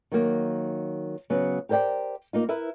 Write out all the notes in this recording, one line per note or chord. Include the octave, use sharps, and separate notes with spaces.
D#3 F#3 A#3
C#3 F#3 B3
G4 A#4 C5 D5 G5
A#3 D#4 F4
E4 A#4 B4 E5